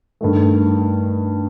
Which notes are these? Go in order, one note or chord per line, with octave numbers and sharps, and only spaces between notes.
G2 D#3 A3